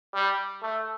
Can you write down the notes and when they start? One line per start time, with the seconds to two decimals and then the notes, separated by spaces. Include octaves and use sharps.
0.14 G3
0.62 A3